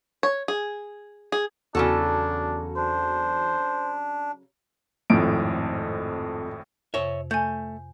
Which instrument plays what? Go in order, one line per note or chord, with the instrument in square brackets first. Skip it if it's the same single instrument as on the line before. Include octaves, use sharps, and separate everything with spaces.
[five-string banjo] C#5
G#4
G#4
[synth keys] E2 F#4 [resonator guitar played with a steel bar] C#3 F#3 A4 [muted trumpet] D4
[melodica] D4 [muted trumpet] C5
[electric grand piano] G#1 A2 D7 [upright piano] F2
[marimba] F2 C3 [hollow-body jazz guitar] C#5 E5
[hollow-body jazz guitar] A3 [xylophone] G#5 G6